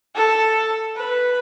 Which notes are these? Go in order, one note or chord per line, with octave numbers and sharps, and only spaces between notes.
A4
B4